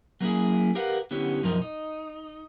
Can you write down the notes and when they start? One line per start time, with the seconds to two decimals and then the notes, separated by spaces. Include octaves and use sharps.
0.20 F#3 A3 A#3 C#4 E4 G#4
0.75 G4 A#4 B4 F5 F#5
1.11 D3 B3 C#4 E4 G4 C#5
1.43 F#2 B2 F3 D#4 A#4
1.62 D#4